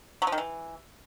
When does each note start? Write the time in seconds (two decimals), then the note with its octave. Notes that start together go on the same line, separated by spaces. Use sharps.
0.22 F#3
0.27 F3
0.32 D#3
0.38 E3